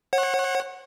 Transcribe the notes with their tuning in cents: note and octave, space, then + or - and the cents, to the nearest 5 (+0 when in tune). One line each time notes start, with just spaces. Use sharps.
C#5 -40 F#5 +0